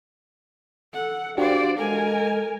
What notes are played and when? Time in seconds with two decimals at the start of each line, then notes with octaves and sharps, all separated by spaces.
0.94 A4 F#5
1.38 D4 F#4 G4 C5 D5 F5
1.78 G#3 A4 A#4 G#5